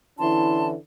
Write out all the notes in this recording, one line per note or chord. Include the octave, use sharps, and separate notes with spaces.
D3 E3 C#4 E4 A5 C6